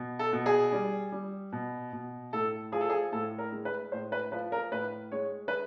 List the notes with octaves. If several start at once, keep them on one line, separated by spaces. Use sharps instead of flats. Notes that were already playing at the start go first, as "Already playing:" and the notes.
Already playing: B2
A4
B2
G#4
G3
G3
B2
B2
A2 A4
F3 G#4
A4
G#4
A2 A4
A#4
G#3
B4
A2 C5
B4
F3 B4
A#4
A2 B4
G#3 C#5
B4